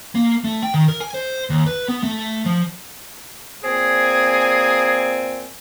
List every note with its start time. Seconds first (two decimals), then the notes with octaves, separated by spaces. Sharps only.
0.15 A#3
0.44 A3
0.62 G5
0.74 D#3
0.88 A#4
1.00 G#5
1.14 C5
1.50 D#2
1.67 B4
1.88 B3
2.03 A3
2.45 F3
3.64 A#2 C4 G#4 G#5